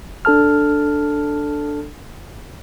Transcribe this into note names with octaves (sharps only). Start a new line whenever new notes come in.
D4 A4 A5 F6